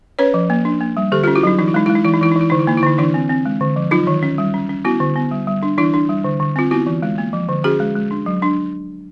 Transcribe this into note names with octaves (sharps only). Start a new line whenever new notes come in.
C#4 B4 C#5
F3
A#3
D4
A#3
G3
D3 G4 A4
C#4 F4 G4
E4 F#4
F#3 D#4
E3 D#4
E4
G#3 D#4
G#3 E4
D#4
E3 E4
D#4
E3 E4
D#4
E3 E4
D3 D#4
E4
A#3 D#4
E4
D3 D#4
E3 D4 E4
C4
C4
G#3
D3
F3
F#3 D#4 F4
D#3
C#4
G3
C#4
C#4
B3 E4 F#4
D3
B3
G3
G3
D4
E3 D4 E4
D4
G3
D3
D3
C4 F4
B3 E4 F#4
E3
G#3
A#3
F3
D3
C#4 F#4 G#4
G#3
G#3
D4
F#3
D4